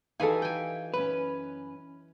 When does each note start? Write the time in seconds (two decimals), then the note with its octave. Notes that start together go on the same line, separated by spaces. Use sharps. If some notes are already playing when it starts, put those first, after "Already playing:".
0.20 E3 D#4 F#4 G4 A4 F5 G#5
0.42 G5 G#5
0.94 F#2 C#4 B4